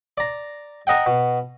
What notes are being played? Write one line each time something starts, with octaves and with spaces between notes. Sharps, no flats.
D5 A#5
A#4 D#5 F#5 G5
B2